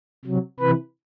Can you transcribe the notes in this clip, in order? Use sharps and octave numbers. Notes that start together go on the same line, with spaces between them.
C3 F#3
C3 E3 B4